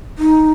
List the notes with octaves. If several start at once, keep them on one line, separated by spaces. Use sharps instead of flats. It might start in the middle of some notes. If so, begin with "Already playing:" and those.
D#4